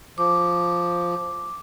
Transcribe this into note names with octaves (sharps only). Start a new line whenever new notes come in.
F3 D6